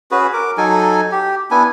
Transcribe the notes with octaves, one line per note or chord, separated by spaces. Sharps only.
C#4 F#4 G#4 B4
A#4 D6
F#3 D#4 A4 G#5
G4
B3 D4 E4 G#5